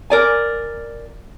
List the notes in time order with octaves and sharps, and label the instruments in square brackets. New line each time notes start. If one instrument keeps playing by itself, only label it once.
[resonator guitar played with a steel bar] A#4 D5 G#5